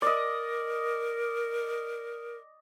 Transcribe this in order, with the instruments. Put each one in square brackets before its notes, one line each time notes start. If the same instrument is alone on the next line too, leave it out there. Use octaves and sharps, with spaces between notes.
[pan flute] A#4 [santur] D5 D#5